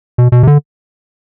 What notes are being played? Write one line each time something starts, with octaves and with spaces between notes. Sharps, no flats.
B2
B2
C3
D3